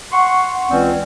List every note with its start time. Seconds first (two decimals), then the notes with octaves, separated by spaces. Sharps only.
0.12 F#5 C6 C#6
0.70 C#2 E3 C4 C#4 D5